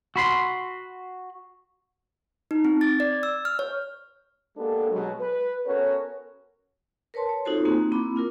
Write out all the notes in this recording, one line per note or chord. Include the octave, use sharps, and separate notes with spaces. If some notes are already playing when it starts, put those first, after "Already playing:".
F#4 B5 C6
D#4
C4
A6
D5
E6
F6
C#5
G#3 A#3 B3 D4 G4 A4
B2 F#3 G#3
B4
B3 C#4 F#4 A4 A#4 C#5
A#4 B4 C#5 A5 C6
C#5
C4 D#4 F4 F#4 A4 C5
A#3 C4 D#4 F#4
A#3 C4 E4 B5 D6
D4 F4 A#4